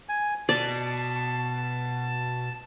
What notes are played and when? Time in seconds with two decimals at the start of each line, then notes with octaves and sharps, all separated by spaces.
0.09 G#5
0.49 B2 D5 A5